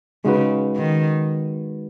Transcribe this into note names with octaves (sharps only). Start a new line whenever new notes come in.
C#3 G#3 D#4 F#4 B4
D#3